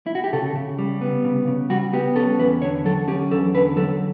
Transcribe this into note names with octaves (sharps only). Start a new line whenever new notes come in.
E4
F#4
G4
C#3 A4
C#3
G3
B3
C#3
C#3
G3 F#4
B3 G4
C#4 A4
E2 B4
D3 C#5
F#3 A4
C#4 G4
E2 A4
D3 B4
F#3 A4